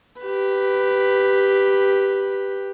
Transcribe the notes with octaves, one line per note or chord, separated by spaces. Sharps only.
G4 B4